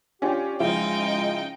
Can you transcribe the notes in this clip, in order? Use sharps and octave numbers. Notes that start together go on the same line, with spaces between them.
C#4 D4 F4 G4
C#3 F3 G#3 D#4 E4 G5